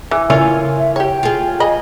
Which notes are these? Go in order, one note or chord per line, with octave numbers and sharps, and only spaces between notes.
E3 G#5
C#3 E4 F4 A#4 C#5 G#5
E5
G4 C#5 G5
F4 G#4
D#5 G#5 B5